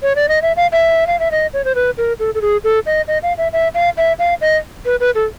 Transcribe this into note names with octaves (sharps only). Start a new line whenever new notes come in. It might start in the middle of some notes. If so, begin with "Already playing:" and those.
C#5
D5
D#5
E5
F5
E5
F5
E5
D#5
C#5
C5
B4
A#4
A4
A4
G#4
A4
D#5
D#5
F5
E5
E5
F5
E5
F5
D#5
B4
B4
A4